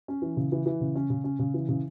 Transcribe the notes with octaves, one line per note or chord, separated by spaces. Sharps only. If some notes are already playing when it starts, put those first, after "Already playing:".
C#4
E3
C#3
E3
E3
C#3
C#4
C#3
C#4
C#3
E3
C#3